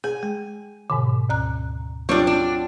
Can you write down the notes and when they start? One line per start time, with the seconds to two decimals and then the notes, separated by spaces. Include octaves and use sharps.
0.04 G#4 G#5
0.23 G#3
0.90 G#2 B2 D3
1.30 D2 A#5 F#6
2.09 F#3 G3 C4 D4 F4 C#6
2.27 D4